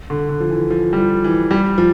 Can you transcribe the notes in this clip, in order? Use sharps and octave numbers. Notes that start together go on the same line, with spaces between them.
D3
D3
F3
E3
F3
G3
F3
E3
G3
F3